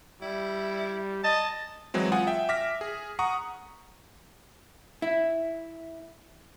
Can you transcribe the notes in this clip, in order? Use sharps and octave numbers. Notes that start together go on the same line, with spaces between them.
G3 E4
D#5 A5
E3 F#3 G#3 C4
F4 F#5 G#5 D#6
E5 G5
E5 D6 F6 A#6 B6
G#4
F#5 A#5 C#6 D#6
E4